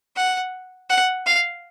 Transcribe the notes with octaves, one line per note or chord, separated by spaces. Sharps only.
F#5
F#5
F5